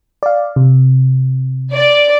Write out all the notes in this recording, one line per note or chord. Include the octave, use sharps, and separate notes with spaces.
D5 F5
C3
D5